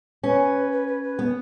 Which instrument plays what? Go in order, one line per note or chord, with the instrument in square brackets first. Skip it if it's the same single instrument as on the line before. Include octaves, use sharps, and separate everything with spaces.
[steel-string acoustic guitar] C#4 [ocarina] B4
[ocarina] B4
B4
B4
[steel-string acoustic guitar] B3